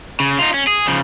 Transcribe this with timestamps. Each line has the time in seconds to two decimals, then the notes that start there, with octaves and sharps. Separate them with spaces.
0.20 C#3
0.39 D#4 F4
0.54 C#4
0.67 G#4
0.87 C#3 F3